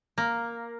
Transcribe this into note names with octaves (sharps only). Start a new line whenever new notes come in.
A#3